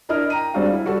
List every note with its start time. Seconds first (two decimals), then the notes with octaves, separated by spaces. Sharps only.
0.09 D4 E4 A#4 D#5 F6
0.30 G5 A#5 D#7
0.54 G3 G#3 C4 D4 F#4 F5
0.72 E4
0.85 G3 F#4 G4 A4